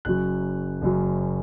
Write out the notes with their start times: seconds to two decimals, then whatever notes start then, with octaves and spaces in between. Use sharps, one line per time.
0.05 F#1 F#2 F#3 F#6
0.82 F#1 F#2 F#3